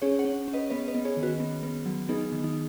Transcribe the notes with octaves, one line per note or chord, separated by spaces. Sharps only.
C#4 G#4 C#5
C#5 F#5
C#4
C#4
B4 D#5
B3 B4 D#5
B4 D#5
B3
G#4 C#5
D#3
F#4 B4
B3
B3
F#3
B3 D#4 G#4
D#3
D#4